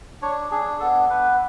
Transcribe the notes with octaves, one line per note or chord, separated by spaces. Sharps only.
D4 C#5
D4 G#4
B3 A4
B3 B4